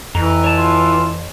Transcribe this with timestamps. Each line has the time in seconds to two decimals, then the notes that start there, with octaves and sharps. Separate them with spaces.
0.15 F2 E3 A#5
0.44 C#5 A5
0.58 F4